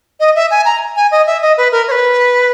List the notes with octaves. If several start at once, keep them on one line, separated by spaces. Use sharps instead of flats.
D#5
E5
G#5
A#5
G#5
D#5
E5
D#5
B4
A#4
C#5
B4